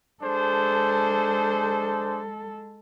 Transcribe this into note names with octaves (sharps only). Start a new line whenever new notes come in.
G#3 D4 G#4 A4 C5